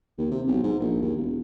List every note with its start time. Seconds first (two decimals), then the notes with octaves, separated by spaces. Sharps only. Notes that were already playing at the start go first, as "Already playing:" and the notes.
0.18 D#2
0.31 C3
0.47 B1
0.63 G#2
0.80 A#1
1.02 D#2
1.16 E1